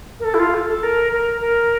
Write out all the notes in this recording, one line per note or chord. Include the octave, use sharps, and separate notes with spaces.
A#4
A4
E4
F4
A4
A4
A#4
A#4
A#4